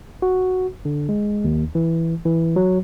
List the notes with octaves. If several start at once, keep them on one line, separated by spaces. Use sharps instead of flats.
F#4
D3
G#3
D#2
E3
E3
F#3